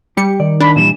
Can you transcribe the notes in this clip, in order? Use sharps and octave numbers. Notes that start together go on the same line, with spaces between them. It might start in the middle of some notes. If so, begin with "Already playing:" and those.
G3 G4 C#7
D#3 D5
D4 B5
A#2 E3 G3 E7